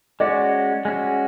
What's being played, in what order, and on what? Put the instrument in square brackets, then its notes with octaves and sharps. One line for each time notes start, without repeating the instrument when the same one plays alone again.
[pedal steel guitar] G#3 C#4 F#4 [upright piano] D5
[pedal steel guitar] G#3 C#4 F#4